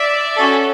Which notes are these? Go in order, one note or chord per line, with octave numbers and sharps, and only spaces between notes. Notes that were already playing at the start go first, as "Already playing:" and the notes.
Already playing: D5 E5
C#4 F#4 A4